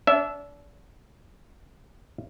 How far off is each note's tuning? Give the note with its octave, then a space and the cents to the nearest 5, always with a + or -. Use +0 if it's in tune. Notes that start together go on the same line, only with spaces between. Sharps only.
D4 -35 E5 +0